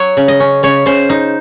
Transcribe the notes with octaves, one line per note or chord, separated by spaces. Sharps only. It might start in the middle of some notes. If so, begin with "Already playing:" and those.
Already playing: F#3 C#5
C#3
D#5
C#4
C#3 C#5
C#3 C5
D#4